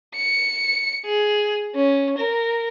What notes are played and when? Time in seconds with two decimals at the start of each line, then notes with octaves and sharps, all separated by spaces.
0.15 C#7
1.05 G#4
1.75 C#4
2.18 A#4